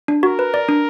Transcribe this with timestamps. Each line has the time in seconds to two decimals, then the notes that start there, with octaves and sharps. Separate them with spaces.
0.08 D4
0.23 F#4 A#4
0.39 B4
0.54 D5
0.69 D4